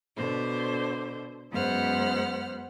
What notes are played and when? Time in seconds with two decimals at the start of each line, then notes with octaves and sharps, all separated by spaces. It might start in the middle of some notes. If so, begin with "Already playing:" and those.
0.15 B2 D3 C5
1.50 F#2 G#3 B3 C5 F#5 F6